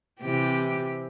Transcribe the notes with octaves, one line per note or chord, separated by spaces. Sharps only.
C3 E3 G4